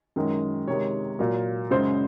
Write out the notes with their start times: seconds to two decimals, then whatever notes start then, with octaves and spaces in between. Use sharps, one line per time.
0.16 F#2 D#3 G#3
0.67 C3 D#3 G#3 C#5
1.19 A#2 F#3 A#3
1.71 F#2 C#3 G#3 C5